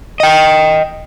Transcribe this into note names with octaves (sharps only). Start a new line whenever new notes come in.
D#5 G5